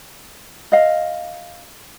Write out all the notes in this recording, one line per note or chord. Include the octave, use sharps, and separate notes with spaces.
D#5 F5